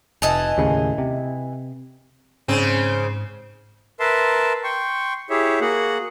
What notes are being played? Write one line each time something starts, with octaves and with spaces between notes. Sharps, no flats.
F1 E3 D#5 A5
D#2 A2 C#3
C3
G#2 C#3 C4
A#4 B4 E5 A5 C6
G5 C6 C#6
E4 G4 G#4 C#5 E5
A#3 F#4 G#4 F#5